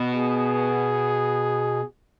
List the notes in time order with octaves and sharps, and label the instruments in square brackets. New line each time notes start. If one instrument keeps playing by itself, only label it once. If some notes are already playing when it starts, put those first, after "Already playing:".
Already playing: [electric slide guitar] B2 B3
[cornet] G#4